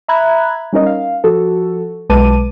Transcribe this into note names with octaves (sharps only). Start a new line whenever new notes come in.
E5 A#5 B5 F#6 G#6
G3 C#4 D#4 A#4 D#5
F5
F3 F#4 A4
B1 G#3 B4 A5 D6 D#7